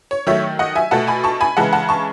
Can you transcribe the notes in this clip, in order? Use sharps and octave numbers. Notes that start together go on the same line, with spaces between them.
C#5
D#3 F#3 A3 C#5 E5
D#5 F#5
E5 G#5
B2 A3 F#5 A5
G#5 B5
A5 C#6
G#5 B5
C#3 E3 G#3 F#5 A5
F#5 A5
A5 C#6